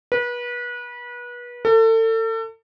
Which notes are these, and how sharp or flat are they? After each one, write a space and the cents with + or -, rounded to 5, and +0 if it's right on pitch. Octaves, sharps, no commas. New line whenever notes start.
B4 -30
A4 +35